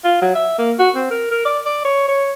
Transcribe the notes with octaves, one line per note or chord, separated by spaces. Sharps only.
F4
F#3
E5
A#3
F#4
C4
A#4
A#4
D5
D5
C#5
C#5